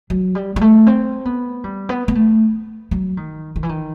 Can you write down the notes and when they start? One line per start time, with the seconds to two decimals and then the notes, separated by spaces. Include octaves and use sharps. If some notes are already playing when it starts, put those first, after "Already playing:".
0.10 F#3
0.35 G3
0.56 G3
0.61 A3
0.87 C4
1.25 B3
1.64 G3
1.89 B3
2.08 B3
2.15 A3
2.91 F#3
3.17 D#3
3.56 D#3
3.63 E3
3.69 D#3